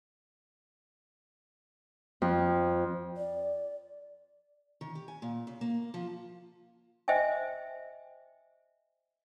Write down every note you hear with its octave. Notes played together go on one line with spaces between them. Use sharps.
F2
D5
D#3
G4
G#5
A#2
C#3
A#3
F3
C5 D#5 E5 G5 G#5